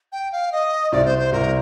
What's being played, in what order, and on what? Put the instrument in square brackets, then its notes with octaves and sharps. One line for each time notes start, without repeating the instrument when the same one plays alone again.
[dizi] G5
F5
D#5
[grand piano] C2 C3 [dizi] D5
[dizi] C5
C5
[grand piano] C2 C3 [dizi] A#4